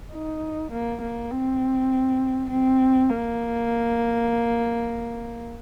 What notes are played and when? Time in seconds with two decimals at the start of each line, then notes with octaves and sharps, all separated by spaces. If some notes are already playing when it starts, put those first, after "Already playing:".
0.12 D#4
0.72 A#3
1.01 A#3
1.31 C4
2.50 C4
3.09 A#3